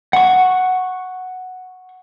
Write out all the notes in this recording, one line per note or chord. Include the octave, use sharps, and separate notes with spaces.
F#5 C#6